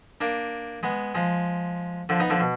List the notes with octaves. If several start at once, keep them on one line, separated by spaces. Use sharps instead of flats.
A#3 D4
G#3 B3
F3 G#3
D3 F3
B3 D#4
D3 F3
B2